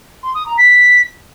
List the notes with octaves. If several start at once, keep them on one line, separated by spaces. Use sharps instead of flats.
C6
D#6
A#5
B6